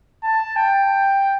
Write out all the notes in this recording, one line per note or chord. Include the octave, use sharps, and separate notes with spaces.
A5
G5